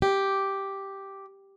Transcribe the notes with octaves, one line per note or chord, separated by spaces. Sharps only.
G4